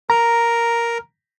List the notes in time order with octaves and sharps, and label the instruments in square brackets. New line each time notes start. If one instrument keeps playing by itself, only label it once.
[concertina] A#4 [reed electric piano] A#5